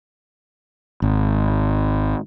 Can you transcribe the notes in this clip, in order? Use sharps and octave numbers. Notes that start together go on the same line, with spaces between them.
G#1